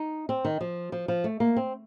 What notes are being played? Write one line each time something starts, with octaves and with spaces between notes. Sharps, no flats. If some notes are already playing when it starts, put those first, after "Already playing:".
Already playing: D#4
C4
D#3
F3
F3
F3
A3
A#3
C4